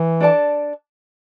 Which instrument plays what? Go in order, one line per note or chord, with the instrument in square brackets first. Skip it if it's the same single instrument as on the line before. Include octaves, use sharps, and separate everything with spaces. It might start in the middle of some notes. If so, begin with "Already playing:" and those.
Already playing: [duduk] E3
[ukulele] D4 A4 D5 A5